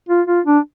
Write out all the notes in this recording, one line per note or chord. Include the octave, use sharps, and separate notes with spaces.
F4
F4
D4